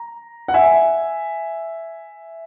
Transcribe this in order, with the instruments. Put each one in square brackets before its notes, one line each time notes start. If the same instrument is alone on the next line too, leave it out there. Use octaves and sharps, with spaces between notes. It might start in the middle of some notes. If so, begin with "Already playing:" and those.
Already playing: [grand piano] A#5
F#5
E5 G#5